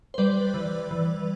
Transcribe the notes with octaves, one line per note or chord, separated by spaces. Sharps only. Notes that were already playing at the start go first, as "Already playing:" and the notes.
C5
G3 B4 D5
E3
E3